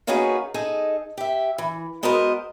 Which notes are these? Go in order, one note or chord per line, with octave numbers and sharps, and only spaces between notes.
A#3 B3 C#4 D#4 F#4 G#4
D#4 G#4 A4 D#5
G4 E5
E3
G#3 B3 F#4 A#4 C5 D#5